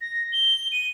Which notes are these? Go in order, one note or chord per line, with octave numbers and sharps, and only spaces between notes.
A#6
G7
D#7